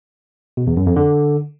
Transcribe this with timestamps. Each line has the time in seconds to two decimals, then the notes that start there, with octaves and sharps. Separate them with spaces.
0.57 B2
0.67 E2
0.77 F#2
0.87 F2
0.96 D3